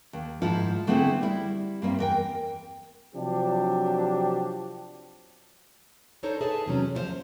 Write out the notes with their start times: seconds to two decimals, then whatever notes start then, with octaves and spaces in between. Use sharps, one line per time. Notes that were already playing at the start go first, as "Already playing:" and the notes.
0.13 D#2
0.42 G#2 F3 E4 F4
0.87 D3 A3 B3 C4 E4 G#4
1.21 G3 E4
1.82 G2 A#3 C4 E5
1.99 E2 A#4 G5
3.15 C3 F3 F#3 D4 G4
6.23 D4 D#4 A4 C5 C#5
6.41 G#4 A4 B4 E5 G#5 A5
6.66 E2 C3 F#3 C#4
6.94 D#2 F3 C#4 E4 C5 F5